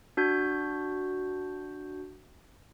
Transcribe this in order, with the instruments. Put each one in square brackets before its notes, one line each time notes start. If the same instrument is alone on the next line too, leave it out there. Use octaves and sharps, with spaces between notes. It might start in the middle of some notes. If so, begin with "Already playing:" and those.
[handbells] D4 F#4 G6